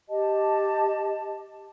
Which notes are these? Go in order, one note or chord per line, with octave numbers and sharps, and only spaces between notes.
G4 D#5 A5